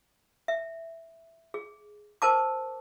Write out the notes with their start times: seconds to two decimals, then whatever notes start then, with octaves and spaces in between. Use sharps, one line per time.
0.48 E5
1.54 G#4
2.22 A#4 C5 A5 D6